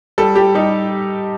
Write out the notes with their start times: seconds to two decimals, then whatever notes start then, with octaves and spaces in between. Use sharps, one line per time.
0.18 G3 A4
0.35 G3 G4
0.55 G3 D#4